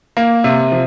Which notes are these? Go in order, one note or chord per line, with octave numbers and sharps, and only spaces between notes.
A#3
C3
F3